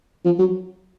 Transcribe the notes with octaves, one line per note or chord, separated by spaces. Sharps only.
F3
F#3